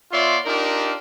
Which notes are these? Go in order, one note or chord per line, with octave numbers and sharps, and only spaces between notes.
B3 F4 C#5 D5 E5 C6
D4 D#4 F4 G4 A#4